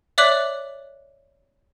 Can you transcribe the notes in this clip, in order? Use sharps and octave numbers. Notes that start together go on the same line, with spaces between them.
C#5 D5 E5 D6 F#6 F#7